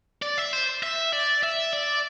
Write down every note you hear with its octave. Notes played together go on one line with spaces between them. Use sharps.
D5
E5
C5
E5
D5
E5
D5